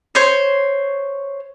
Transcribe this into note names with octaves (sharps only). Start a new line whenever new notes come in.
C5 C#5